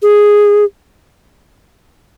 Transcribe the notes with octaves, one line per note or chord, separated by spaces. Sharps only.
G#4